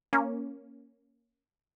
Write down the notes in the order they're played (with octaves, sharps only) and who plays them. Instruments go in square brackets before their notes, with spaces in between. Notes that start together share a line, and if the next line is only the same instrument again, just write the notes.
[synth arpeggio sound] A#3 C#4